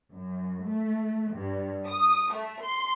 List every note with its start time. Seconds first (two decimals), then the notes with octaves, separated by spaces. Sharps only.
0.12 F#2
0.66 A3
1.34 G2
1.86 D#6
2.32 A3
2.62 C6